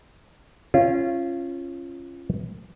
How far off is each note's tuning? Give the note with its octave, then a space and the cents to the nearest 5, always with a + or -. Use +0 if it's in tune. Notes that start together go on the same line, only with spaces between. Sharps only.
C#4 -20 F4 -25